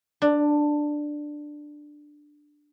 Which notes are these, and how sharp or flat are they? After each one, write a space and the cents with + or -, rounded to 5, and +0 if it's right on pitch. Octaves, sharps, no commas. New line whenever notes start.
D4 +10